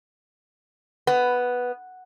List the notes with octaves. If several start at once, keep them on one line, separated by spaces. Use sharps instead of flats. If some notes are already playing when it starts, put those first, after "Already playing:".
B3